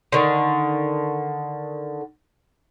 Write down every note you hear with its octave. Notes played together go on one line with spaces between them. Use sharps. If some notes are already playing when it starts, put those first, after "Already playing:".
D3 D#3